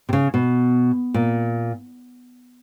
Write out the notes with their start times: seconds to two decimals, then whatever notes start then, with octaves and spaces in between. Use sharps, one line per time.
0.09 C3
0.13 C#3
0.34 B2
1.14 A#2